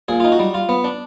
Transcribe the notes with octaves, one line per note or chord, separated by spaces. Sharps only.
A#2 G#4
D#4 F4
F#4
G3
F4
B3
D4